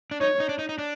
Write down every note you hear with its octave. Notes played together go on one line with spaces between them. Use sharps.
D4
D#4 C#5
D#4
D4
D#4
D#4
D4